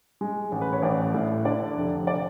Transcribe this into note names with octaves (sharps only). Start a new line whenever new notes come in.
G#3
A1
B4
C#5
A1 D5
A2
D3 D5
F1
D5